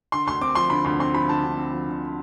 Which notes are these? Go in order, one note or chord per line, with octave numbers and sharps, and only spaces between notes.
D3 C6
D2 C6
C4 D6
F3 C6
D3 B5
D2 C6
C4 C6
F3 B5
D3 A5
D2
C4
F3
D3